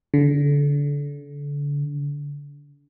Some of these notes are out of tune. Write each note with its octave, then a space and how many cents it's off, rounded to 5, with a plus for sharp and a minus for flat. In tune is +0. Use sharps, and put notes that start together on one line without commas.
D3 -30